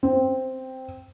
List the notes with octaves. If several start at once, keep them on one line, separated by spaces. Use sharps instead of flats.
C4